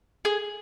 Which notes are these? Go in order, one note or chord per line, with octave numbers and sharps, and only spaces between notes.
G#4